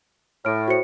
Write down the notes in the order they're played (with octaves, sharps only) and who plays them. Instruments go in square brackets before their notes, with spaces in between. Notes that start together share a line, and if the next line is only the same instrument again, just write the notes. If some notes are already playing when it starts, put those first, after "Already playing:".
[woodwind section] A2 [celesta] F6 D7
[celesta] F#4 C5 C#7